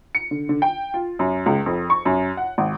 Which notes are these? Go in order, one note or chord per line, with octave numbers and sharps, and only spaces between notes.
C#7
D3
D3
G5
F4
F#2
C#2
F2
C#6
F#2
F#5
G#1